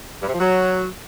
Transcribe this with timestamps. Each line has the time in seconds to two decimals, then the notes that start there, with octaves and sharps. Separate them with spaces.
0.22 G2
0.28 C3
0.34 F3
0.40 F#3